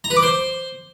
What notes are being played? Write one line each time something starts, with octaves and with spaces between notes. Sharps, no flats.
A#5
B4
D6
C5